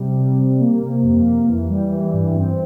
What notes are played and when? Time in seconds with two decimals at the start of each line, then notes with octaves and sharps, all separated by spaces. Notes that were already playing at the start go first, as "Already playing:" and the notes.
Already playing: C3 G3
0.15 G3
0.38 G3
0.59 A#3
0.82 C3
1.03 F2
1.26 A#3
1.48 E3
1.70 G3
1.92 E3
2.14 G2
2.36 C4